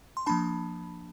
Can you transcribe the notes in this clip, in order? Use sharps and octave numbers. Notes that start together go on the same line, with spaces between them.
C6
F3 A#3 D4 A5 B5